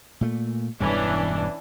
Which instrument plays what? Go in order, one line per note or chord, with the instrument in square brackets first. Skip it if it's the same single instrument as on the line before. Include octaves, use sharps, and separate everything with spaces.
[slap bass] A#2 A3
[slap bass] E1 G2 G3 [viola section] E3 C#4 D4